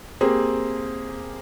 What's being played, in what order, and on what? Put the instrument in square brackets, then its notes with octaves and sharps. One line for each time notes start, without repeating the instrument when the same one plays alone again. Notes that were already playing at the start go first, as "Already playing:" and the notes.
[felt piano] A#3 C4 G4 G#4